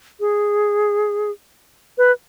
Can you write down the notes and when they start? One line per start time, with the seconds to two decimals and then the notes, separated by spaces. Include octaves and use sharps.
0.20 G#4
1.98 B4